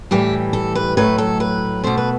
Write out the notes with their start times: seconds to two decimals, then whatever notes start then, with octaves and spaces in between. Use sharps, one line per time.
0.11 A2 E3 G3 G4
0.53 A4
0.75 B4
0.97 A2 F#3 A3 B4
1.18 A4
1.40 B4
1.84 B2 A3 C5
1.97 B4